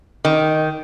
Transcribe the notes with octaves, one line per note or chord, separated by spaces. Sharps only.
D#3